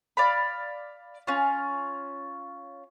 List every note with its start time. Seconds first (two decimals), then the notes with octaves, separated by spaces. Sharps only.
0.17 D5 F5 B5
1.27 C#4 F4